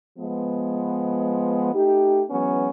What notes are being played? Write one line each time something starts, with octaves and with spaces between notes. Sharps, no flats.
F3 G#3 B3
A3 D#4 G4
E3 F#3 G#3 B3 C#4